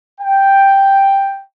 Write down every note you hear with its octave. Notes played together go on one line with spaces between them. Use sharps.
G5